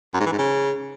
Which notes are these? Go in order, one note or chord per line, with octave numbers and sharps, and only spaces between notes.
F#2
G#2
E3
G#2
C#3